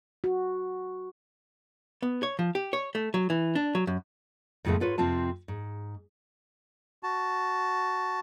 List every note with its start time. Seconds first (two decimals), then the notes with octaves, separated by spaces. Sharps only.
0.24 F#4
2.02 B3
2.23 C#5
2.39 F3
2.55 G4
2.73 C#5
2.95 A3
3.14 F#3
3.30 E3
3.55 D4
3.75 F#3
3.87 F#2
4.65 F2 A2 C#3 G#3 A3 B3
4.80 G#2 F4 B4 C#5
4.98 F2 C3 C4 F4 A5
5.48 G#2
7.03 F#4 A5